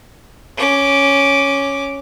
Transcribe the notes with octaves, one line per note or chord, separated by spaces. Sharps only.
C#4 D6